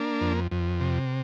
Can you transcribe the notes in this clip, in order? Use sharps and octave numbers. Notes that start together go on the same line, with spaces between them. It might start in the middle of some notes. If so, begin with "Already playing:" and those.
Already playing: A#3 D4
F2
F2
C3